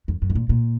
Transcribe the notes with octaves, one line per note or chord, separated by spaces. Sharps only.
F2
F#2
B2
A#2
A#2